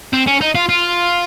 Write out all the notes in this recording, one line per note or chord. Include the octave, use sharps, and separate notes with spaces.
C4
C#4
D#4
F4
F4